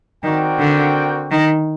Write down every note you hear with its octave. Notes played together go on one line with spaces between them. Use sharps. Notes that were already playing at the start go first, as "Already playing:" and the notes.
D#3 C4 F#4 A#4 D5 G5
D3
D#3